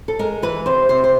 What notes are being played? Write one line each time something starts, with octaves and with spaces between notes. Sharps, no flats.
A4
G#3 A#4
E3 B4
C3 C5
C3 C5
C5